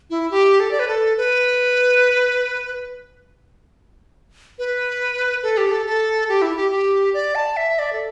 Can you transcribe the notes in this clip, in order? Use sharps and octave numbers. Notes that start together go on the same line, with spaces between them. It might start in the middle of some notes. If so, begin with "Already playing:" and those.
E4
G4
A4
D5
B4
A4
B4
B4
A4
G4
A4
A4
G4
E4
G4
G4
D5
A5
E5
D5
A4